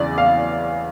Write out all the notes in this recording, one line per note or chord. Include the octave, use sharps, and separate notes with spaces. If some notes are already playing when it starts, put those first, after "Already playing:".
Already playing: E2 C#3 E3 D5
F5